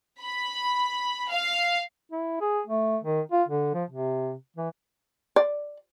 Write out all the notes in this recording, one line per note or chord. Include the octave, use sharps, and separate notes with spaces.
B5
F5
E4
G#4
A3
D#3
F4
D3
F3
C3
E3
D5